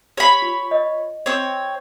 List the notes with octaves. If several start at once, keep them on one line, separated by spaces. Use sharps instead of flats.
C#5 B5
F4
D#5
C4 C#5